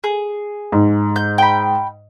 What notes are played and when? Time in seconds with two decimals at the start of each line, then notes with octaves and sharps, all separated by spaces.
0.04 G#4
0.72 G#2
1.16 G6
1.38 G5 B5